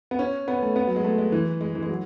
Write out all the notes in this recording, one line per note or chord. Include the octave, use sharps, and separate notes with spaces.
B3
C#4
B3
A3
B3
F#3
G#3
A3
G#3
E3
G#3
E3
G#3
F#3